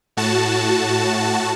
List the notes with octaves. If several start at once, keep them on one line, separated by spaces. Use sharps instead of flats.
A2 F#4 A5